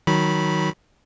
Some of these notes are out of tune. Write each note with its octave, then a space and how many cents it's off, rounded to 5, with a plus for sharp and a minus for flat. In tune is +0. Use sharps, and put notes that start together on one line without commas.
D#3 +0 F#3 +0 B5 -15